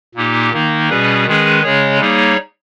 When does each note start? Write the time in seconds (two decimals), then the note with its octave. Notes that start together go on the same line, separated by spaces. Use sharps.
0.15 A#2 A#3 D#4 G4
0.52 D#3 A#3 D#4
0.89 B2 G3 C#4 G#4 B4
1.26 D#3 G#3 C#4 G#4 B4
1.63 C#3 G#3 C#4 G#4 C#5
2.00 G3 A#3 D#4 G#4 C#5